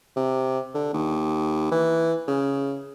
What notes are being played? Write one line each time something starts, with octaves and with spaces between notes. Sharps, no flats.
C3
D3
D#2
E3
C#3